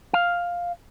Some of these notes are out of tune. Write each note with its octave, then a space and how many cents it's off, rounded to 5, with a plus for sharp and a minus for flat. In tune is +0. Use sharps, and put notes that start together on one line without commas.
F5 +5